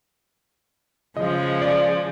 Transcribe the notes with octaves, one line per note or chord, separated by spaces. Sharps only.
C#3 F3 G#3 D#5
D5